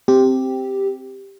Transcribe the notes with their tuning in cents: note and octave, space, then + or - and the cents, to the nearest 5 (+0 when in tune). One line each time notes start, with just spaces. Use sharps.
C4 +0 G4 +0